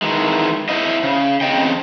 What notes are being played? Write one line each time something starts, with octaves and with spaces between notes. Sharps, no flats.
D#3 E3 G#3
E4 C5 D#5
C#3
E2 C#3 C4 D#5 G5